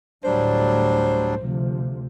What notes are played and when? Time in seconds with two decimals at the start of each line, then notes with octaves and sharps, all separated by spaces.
0.24 D2 A2 F#3 G3 D4 C5
1.38 D2 C3 F3